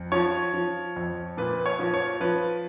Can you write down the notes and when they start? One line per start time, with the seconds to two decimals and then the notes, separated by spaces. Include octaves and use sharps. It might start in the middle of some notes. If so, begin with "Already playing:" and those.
Already playing: F2
0.12 F3 C#5
0.54 F3
0.96 F2
1.37 A#2 B4
1.66 C#5
1.79 F3
1.94 C#5
2.20 F3 B4